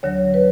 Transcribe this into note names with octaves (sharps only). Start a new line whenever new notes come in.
D2 D3 F#3 C#5
B4